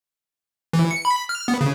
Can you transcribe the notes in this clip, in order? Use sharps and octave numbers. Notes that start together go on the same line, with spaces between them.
E3
C#7
B5
F6
B3
C#3